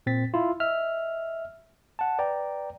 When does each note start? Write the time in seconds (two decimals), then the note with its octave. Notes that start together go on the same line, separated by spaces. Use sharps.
0.06 A#2 C4 A6 B6
0.34 E4 F4
0.60 D#5 E5 F6
1.99 F#5 A5
2.19 B4 D5 G5 A#5